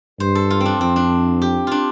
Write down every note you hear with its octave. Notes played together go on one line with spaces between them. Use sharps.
G2 C5
A4
F4
C4 D4
F2 C4
D4
G4
D4 F4